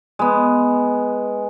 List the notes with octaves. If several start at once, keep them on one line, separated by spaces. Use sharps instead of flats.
G#3 B3